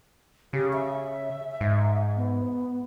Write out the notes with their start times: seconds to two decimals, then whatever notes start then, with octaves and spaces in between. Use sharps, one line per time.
0.53 C#3 G4
0.73 E5
1.61 G#2
2.16 B3